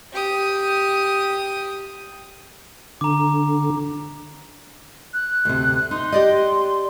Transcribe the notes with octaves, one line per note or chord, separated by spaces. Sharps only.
G4 D#6
D3 A#5 D6
F#6
D2 C3
D#4 C6
G4 D5 D#5